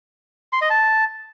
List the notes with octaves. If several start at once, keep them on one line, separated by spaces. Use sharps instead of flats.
C6
D#5
A5